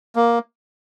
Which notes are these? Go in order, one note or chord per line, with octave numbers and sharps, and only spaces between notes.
A#3